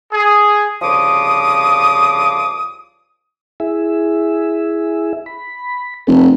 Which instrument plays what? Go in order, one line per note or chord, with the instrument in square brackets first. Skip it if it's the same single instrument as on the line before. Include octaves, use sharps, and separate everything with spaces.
[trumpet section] G#4
[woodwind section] C2 C#3 F3 D6 D#6
[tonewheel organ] E4 G#4 E5
B5
[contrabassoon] F1 [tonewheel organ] A4 B4